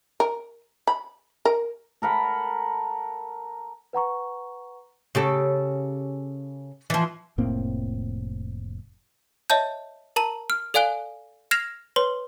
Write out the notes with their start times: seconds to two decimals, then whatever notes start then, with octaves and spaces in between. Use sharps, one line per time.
0.20 A#4
0.87 B5
1.45 A#4
2.02 A4 A#4 F#5 B5
3.93 B4 F#5 A#5 C#6
5.15 C#3 G4 A4
6.90 E3 F3
7.38 F1 A2 A#3 C4
9.50 C#5 D#5 E5 A5 G6
10.16 A#4 A5 A#5 D#7
10.50 F6
10.74 A4 D5 F5 G#5 F#6 G7
11.51 F6 G#6 A#6 C7 E7 F7
11.96 B4 C#5 C6